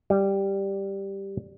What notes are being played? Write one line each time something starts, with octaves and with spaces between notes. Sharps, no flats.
G3